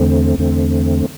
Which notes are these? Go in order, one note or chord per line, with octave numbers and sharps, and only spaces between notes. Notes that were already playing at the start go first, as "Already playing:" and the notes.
Already playing: E2 D3 A3 C4
E2 D3 A3 C4